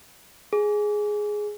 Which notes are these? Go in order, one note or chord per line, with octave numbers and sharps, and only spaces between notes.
G#4